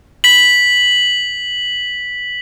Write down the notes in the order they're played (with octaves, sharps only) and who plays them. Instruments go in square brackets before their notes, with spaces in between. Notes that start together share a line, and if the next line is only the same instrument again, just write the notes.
[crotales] B6 F#7